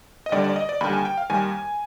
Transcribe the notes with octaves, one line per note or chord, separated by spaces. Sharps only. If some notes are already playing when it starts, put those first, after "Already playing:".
D#5
D#2 D3 G3 D5
D5
D#5
D5
D#2 D3 G3 B5
G#5
G5
F5
D#2 D#3 G3 G#5